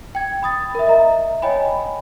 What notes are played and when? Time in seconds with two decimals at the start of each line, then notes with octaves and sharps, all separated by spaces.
0.15 G5 G#6
0.43 B5 D#6 A6
0.75 A#4 E5
0.87 D#5 E5 A#5
1.42 C#5 D#5 G5 G#5 B5